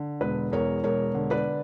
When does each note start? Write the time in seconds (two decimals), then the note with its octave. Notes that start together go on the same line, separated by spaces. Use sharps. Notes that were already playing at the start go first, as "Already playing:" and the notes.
Already playing: D3
0.21 E1 B4
0.52 E2 A#4 C#5
0.84 E1 A#4 C#5
1.14 D3
1.30 B4 D5